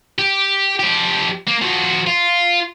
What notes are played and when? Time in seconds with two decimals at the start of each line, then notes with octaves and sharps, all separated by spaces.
0.19 G4
0.80 F3 G4
1.47 A#3
1.62 F3 F#4
2.07 F4